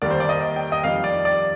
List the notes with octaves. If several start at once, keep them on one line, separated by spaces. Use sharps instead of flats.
D#2 D#3 G3 A#3 D5
C5
D5
D#5
G5
D#5
F2 D#3 G3 F5
D5
D5